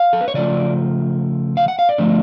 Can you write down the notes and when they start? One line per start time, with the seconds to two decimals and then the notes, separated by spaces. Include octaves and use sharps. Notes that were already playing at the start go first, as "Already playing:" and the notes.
Already playing: F5
0.13 A4
0.21 B4
0.28 C#5
0.34 C#3 F3 A3 D5
1.57 F5
1.68 F#5
1.79 F5
1.89 D5
1.98 D3 F3 A3